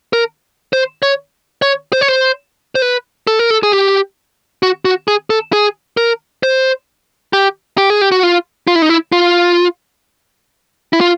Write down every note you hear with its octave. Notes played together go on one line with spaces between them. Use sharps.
A#4
C5
C#5
C#5
C5
C#5
C5
C5
B4
A4
A#4
A4
G#4
G4
F#4
F#4
G#4
A4
G#4
A#4
C5
G4
G4
G#4
G4
F#4
F4
F4
E4
D#4
E4
F4
E4
F4